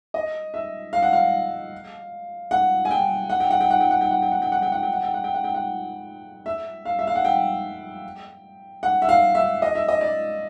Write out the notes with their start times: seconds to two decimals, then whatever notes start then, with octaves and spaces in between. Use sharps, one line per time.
0.14 D#5
0.54 E5
0.93 F5
1.02 F#5
1.13 F5
2.51 F#5
2.85 G#5
2.91 G5
3.30 F#5
3.40 G5
3.51 F#5
3.61 G5
3.71 F#5
3.80 G5
3.91 F#5
4.01 G5
4.11 F#5
4.22 G5
4.32 F#5
4.42 G5
4.52 F#5
4.62 G5
4.72 F#5
4.83 G5
4.93 F#5
5.03 G5
5.14 F#5
5.24 G5
5.34 F#5
5.44 G5
5.54 F#5
6.46 E5
6.85 F5
6.99 E5
7.07 F5
7.15 F#5
7.25 G5
8.83 F#5
9.02 E5
9.09 F5
9.35 E5
9.62 D#5
9.75 E5
9.88 D#5
10.01 D5